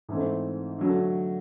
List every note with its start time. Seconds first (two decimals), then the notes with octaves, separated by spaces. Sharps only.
0.09 G#2 E3 A3 C4
0.79 D3 F#3 A3